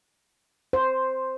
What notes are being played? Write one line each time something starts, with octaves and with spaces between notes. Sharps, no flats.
C5